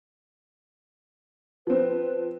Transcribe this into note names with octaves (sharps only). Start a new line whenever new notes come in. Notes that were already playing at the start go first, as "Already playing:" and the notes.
F3 C4 B4